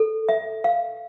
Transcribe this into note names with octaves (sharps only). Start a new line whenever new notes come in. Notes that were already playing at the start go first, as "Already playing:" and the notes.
Already playing: A4
E5
F5